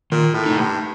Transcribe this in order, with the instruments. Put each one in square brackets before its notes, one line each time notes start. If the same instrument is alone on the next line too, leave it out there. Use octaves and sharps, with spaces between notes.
[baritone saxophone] A#2 [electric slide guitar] D#3
[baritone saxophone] A2
[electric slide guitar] A3 D#4
[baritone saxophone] G2